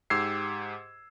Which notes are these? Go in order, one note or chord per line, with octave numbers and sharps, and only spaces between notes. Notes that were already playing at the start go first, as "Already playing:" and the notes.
G#2 G4 E6 G#6 C7